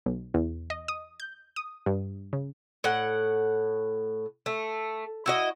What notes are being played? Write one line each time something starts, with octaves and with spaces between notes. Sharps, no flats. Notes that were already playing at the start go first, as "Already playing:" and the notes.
B1
E2
D#5
D#6
G6
D#6
G2
C#3
A2 F#5
A3
E4 F#4 D#5